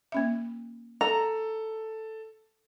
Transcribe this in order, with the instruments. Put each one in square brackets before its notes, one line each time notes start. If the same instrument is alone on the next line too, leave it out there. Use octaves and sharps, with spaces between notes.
[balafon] A#3 C#4 E5
[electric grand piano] A4 [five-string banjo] A#5